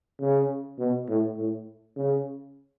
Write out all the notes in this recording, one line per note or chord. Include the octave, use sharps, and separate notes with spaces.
C#3
B2
A2
A2
C#3